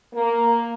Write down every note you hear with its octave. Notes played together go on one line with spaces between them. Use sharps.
A#3